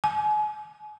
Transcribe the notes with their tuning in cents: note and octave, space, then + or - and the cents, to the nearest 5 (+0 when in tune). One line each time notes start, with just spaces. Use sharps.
G#5 +35